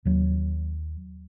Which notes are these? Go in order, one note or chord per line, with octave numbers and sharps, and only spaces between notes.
D#2 F#3